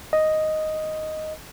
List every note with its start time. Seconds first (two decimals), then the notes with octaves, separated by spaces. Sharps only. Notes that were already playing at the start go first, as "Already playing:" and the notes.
0.13 D#5